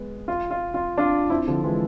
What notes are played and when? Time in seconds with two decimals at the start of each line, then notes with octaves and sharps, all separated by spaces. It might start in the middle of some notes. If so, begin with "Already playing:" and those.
Already playing: G#3 B3
0.28 F4
0.51 F4
0.74 F4
0.98 D4 F4
1.30 C4 E4
1.47 D3 F3
1.64 E3 G#3